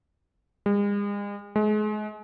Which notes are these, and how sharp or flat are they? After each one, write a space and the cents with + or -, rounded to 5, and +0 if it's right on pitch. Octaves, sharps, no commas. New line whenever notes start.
G#3 -40
G#3 +35